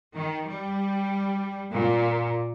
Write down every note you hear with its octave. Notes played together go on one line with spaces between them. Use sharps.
D#3
G3
A#2